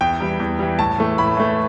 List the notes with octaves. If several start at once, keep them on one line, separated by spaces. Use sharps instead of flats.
E2 G5
E3 G3
E2
E3 G3
A2 A5
E3 A3
A2 B5
E3 A3